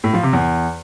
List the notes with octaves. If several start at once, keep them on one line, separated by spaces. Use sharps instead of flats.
A2
F3
C3
E2